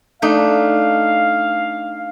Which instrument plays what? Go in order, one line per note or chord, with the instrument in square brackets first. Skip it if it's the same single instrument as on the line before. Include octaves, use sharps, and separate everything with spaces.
[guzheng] A3 D4 D#4 [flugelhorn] F5